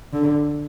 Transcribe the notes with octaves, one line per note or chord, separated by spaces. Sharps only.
D3